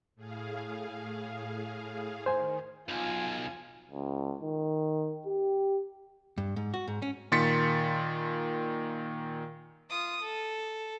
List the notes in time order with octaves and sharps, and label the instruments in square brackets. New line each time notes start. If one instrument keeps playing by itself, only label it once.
[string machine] A2 G#4 F5
[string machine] D#3 [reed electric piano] C5 G#5
[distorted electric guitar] B1 [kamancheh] F4 G#5
[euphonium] C#2
D#3
G4
[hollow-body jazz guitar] G2
G#2
F#4
G#2
C#4
[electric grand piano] A#2 D#3 C6 A6 B6 C#7
[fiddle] F4 D#6
A4